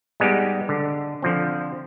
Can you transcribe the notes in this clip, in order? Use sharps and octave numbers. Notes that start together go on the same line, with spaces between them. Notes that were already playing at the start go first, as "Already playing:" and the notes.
G3 G#3 B3 D#4 G4
D3
D3 F3 C4